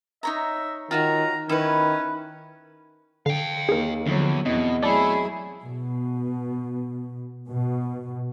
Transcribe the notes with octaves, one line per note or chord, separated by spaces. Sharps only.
D#4 C#5 E5 A#5
D#3 F4 F#4 C#5 A#5
D#3 C#4 E4 B4
D3 F5 G5
D#2 G#4 A#4
E2 D3 F3 F#3
E2 B2 C4 D#5
F#3 A3 E4 G#4 D5 A5
B2
B2